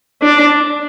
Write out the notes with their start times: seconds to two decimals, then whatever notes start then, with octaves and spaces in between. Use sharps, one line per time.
0.22 D4